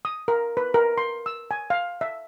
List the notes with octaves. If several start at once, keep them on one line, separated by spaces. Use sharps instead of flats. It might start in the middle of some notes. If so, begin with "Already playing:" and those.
D#6
A#4
B4
A#4
C6
E6
G#5
F5
E5